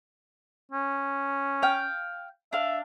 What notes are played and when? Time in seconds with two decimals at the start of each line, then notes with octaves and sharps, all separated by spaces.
0.72 C#4
1.62 F5 G5
2.53 D4 E5 F5